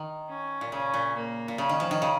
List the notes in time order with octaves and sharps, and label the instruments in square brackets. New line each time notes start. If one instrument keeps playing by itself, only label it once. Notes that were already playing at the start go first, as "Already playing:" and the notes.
Already playing: [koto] D#3
[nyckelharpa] C#4
[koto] A#2
[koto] C#3 [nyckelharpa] C#4
[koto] A#2
[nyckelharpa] A#3
[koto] A#2
[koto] C#3 [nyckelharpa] C#4
[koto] D#3
F3
D#3
C#3